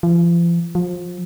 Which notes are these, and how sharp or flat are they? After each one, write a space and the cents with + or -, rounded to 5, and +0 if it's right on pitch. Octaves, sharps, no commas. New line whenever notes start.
F3 -40
F3 +25